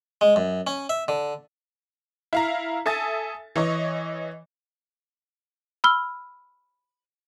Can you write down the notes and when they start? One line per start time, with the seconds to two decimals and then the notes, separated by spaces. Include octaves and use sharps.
0.21 G#3
0.36 F#2
0.67 C#4
0.89 E5
1.08 D3
2.33 E4 F5 A#5
2.86 A4 E5 G#5 D#6 A6
3.56 E3 C#5 D#5
5.84 B5 E6 F6 G7